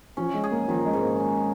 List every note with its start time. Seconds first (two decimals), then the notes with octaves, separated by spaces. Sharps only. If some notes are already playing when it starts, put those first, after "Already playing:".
0.17 F3 C#4
0.34 G#3
0.44 G#4
0.51 A#3
0.68 D#3 F3
0.86 G#3
0.93 G#2
1.02 A#3
1.20 C#4